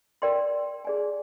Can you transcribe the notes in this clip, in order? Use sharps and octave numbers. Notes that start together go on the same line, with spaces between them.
A#4 D5 G5 C6
G#4 D5 G#5